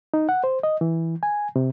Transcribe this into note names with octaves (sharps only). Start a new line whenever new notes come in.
D#4
F#5
C5
D#5
E3
G#5
C3